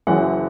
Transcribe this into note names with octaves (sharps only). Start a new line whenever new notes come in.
F#1 F#2 E3 F#5